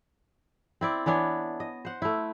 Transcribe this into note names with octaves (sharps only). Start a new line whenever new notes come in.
C4 E4 D5
E3 B3 D4 C#5
D#5
C5 F#5
A3 E4